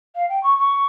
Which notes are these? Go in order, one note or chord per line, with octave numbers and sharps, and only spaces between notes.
F5
G5
C#6
C#6